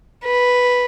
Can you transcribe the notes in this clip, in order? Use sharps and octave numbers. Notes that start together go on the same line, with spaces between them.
B4